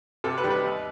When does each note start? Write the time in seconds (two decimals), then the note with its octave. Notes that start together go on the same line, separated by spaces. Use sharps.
0.24 C3 A4
0.38 B4
0.44 D#3 G3
0.50 B4
0.64 D#2